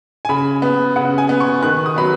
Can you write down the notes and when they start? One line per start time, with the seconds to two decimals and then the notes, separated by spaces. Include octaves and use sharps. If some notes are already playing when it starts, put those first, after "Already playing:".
0.25 G#5
0.29 C#3 B5
0.62 B3
0.96 C#3 F#5
1.18 G#5
1.29 B3
1.40 C#6
1.63 D#3 F#6
1.86 D#6
1.96 F#3 B3 B5